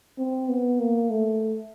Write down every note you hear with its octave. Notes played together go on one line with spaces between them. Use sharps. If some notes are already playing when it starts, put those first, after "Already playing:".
C4
B3
A#3
A3